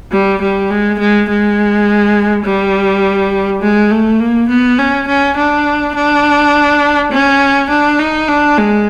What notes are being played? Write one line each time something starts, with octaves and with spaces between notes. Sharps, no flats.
G3
G3
G#3
G#3
G#3
G3
G#3
A3
A#3
B3
C#4
C#4
D4
D4
C#4
D4
D#4
D4
G#3